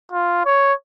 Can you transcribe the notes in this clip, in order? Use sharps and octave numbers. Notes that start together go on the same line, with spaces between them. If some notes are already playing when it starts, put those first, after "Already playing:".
F4
C#5